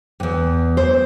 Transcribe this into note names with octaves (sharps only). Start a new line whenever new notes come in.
E2 G2
C5